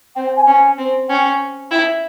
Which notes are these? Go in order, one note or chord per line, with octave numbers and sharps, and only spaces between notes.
C4 G5
G5
G#5
C#4 G#5
C4
C#4 G5
E4 G5